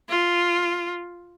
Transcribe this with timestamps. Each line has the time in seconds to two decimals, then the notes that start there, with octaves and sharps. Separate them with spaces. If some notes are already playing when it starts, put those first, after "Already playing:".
0.10 F4